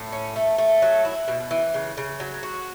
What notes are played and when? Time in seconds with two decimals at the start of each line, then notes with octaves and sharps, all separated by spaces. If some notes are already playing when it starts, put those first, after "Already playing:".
Already playing: A2
0.12 C#4
0.36 A3
0.58 A3
0.82 F#3
1.05 E4
1.28 B2
1.51 E3
1.74 C#3
1.97 C#3
2.20 F#3
2.43 F#4